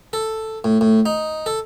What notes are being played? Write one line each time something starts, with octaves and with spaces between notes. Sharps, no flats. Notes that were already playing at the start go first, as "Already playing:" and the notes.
A4
A2
A2
D#4
A4